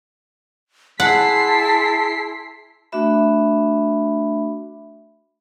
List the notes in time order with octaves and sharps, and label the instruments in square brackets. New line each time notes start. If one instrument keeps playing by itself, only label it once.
[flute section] E4 G#4 C6 [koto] F#5 [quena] A5 [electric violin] B6 C7
[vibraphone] A3 D4 F#4 E5 B5